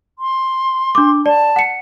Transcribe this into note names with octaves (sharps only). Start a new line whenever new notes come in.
C6
D4 D6
D5 A5
F#5 C#7